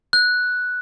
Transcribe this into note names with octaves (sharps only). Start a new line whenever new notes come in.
F#6